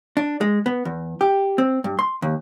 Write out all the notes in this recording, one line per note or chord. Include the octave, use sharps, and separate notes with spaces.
D4
G#3
B3
E2
G4
C4
G2
C6
D#2